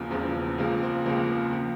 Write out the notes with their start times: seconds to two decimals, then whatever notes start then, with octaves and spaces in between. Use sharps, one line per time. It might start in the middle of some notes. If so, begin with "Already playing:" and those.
Already playing: E1 E2 C#3 F3 A#3
0.11 E1 E2 C#3 F3 C4
0.58 C#2 C#3 F3 A#3
0.82 C4
1.06 C#2 C#3 F3 A#3
1.52 F3